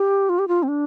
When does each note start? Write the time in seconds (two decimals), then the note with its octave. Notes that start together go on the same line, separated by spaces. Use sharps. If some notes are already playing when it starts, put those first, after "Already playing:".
Already playing: G4
0.29 F4
0.39 G4
0.48 F4
0.63 C4
0.68 D4